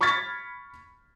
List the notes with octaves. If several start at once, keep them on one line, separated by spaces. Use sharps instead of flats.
B5 C#6 F6 G#6 A6 B6